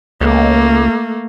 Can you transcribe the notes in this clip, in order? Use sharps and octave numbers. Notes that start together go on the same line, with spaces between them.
C#2 A3 A#3